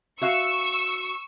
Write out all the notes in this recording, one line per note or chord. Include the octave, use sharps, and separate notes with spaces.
F#4 E5 F5 C#6 E6